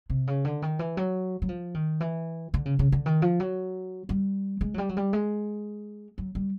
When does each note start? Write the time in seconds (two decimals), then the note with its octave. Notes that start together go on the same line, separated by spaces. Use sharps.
0.10 C3
0.27 C#3
0.45 D3
0.62 D#3
0.79 E3
0.97 F#3
1.42 F#3
1.49 F3
1.74 D#3
2.00 E3
2.54 D3
2.66 C#3
2.79 C#3
2.92 D3
3.06 D#3
3.22 F3
3.40 F#3
4.09 G3
4.61 G#3
4.74 F#3
4.78 G3
4.89 F#3
4.97 G3
5.13 G#3
6.18 F#3
6.35 G3